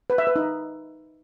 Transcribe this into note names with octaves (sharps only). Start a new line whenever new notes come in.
B4
E5
B4
D#4